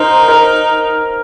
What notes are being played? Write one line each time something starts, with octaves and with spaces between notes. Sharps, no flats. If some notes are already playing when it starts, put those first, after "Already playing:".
Already playing: D#4 A#4 C5 A#5
A#4